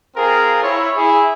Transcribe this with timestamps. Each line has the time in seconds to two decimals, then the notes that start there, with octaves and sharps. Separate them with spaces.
0.15 C4 F4 G#4 A#4
0.62 E4 C#5
0.95 E4 G#4